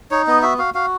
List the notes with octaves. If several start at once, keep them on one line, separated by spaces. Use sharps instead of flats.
D#4 C#5
B3 D#5
F#4 E5
F#4 F5
F#4 F5